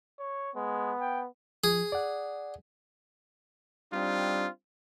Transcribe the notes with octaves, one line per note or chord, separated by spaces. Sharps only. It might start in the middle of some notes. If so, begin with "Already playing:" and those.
C#5
G#3 B3
G5
F3 G#4
D5 F#5
G3 C4 D4 D#4 F4